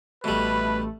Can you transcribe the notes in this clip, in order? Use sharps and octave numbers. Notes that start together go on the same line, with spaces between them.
A1 B2 G3 A3 B4